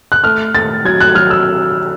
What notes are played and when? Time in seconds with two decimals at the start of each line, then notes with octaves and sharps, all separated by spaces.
0.12 F#6
0.24 A3 F6
0.54 A3 A6
0.85 F#3 G#6
1.01 F#6
1.15 F#3 F6
1.30 E6